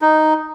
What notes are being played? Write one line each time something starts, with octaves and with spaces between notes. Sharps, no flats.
D#4